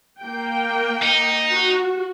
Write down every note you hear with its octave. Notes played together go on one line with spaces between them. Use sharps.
A#3 G5
D#4
F#4